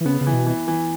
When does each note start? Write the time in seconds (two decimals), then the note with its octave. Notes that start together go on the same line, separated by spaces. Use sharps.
0.01 E3
0.06 C#3 B3
0.21 C#3
0.27 E3
0.33 B2
0.46 E3
0.68 E3